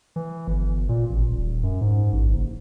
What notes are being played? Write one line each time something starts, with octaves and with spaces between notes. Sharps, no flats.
E3
G1
A#2
A1
D#1
F#2
G#2
A1
F#1